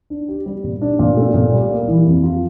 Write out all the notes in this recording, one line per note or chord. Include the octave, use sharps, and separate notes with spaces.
D4
G4
G3
A#2
D4
A#2
A3
A#2
G3
A#3
E3
F2
F4